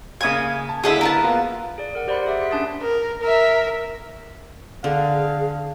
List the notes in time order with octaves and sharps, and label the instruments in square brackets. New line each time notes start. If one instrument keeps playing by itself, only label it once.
[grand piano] C#3 A#3 G#6 [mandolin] G#5 D#6
[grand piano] A5
[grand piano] D3 A#3 E4 [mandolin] G#4 A4 E5
[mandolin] A#4 B4 A5
[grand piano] A#3 B3 F4
[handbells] G#4 D5
A#4 F#5
G4 C5 D5 F#5 B5 C6
G#4 E5 F#5
G#4 C6 B6
C#4 D4 A5 C6 D#6 A6
[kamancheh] A#4
A#4 E5
[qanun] D3 [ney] G#4 [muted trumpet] F5